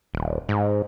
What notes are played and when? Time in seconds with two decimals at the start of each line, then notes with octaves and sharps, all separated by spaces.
0.14 D#1
0.49 G#2